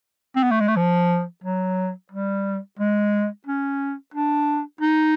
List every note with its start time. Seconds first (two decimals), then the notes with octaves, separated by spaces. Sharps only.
0.36 C4
0.43 B3
0.51 A3
0.60 G#3
0.68 A3
0.77 F3
1.44 F#3
2.12 G3
2.79 G#3
3.47 C#4
4.14 D4
4.81 D#4